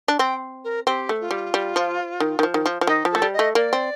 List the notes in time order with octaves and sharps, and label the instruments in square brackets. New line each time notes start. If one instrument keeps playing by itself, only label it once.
[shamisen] D4
[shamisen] C4 [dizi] G5
[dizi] A#4
[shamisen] C4 [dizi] G4
[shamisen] A3
[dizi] F4
[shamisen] G3
G3
F3
D#3
D#3
F3
D#3
F3
F3
[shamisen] D#3 [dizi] D#4
[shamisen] F3
[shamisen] A3 [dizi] A4
[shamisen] G3
[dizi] D#5
[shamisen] A3
[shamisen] A#3 [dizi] D5
[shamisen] C4